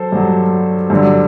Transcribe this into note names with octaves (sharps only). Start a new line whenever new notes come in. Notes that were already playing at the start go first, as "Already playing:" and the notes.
Already playing: F#3 A4 C5
G2 F#3
G2 D3 F#3